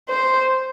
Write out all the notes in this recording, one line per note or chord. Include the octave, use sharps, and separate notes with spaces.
C5